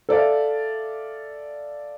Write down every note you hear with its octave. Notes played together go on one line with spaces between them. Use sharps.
A4 D5 E5 F5